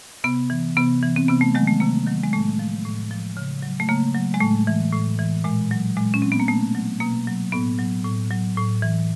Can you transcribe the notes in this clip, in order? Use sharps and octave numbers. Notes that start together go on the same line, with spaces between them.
C3 B3
E3
C3 B3
E3
C4
C3 B3
A3
D#3 F#3 G#3
A3
C3 A#3
D#3 F#3
G#3
A2 A3
F3
A2
F3
C#3
F#3
A3
C#3 A#3
F#3
G#3
A2 A3
E3
A2
E3
A#2 G#3
F#3
A#2 G#3
C#4
F#3 C4
B3
A#3
B2 A3
F#3
B2 A#3
F#3
A2 B3
F#3
A2
F#3
A2
E3